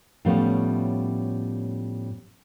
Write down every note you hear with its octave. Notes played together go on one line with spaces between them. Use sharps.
A2 F3 G3 B3 C#4